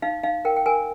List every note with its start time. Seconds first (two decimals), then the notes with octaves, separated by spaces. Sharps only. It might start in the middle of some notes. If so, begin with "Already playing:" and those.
0.02 D#4 F5
0.23 D#4 F5
0.45 A#4 G5
0.56 G5
0.66 A#4 G#5